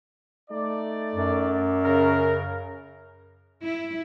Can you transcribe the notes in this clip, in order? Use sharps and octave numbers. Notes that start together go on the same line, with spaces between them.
A3 D#4 D5
F#2
C#3 A#4
E4